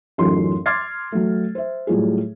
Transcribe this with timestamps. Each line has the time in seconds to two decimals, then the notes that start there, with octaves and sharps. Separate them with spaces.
0.18 A1 F#2 D#4 F4 A4 C6
0.66 C6 D6 F6 G#6 A6 C7
1.12 F#3 A3
1.55 C5 E5
1.87 A2 F#3 G3 F4 G#4